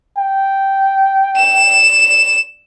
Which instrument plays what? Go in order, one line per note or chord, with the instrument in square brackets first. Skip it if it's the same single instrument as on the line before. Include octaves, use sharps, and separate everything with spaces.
[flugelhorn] G5
[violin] E7